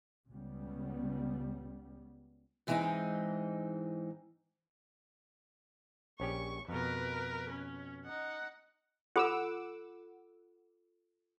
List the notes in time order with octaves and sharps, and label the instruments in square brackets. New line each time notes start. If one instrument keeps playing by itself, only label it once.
[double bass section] C#2 C#3 G3 B3
[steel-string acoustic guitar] G#2 E3 G#3 A#3 C4 D#4
[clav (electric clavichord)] A#1 C#4 G4 [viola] C#6
[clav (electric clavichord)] F2 B2 [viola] A#4 B4
[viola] C#4
D#4 F#5
[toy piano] F4 A4 B5 [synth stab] F#5 D6 E6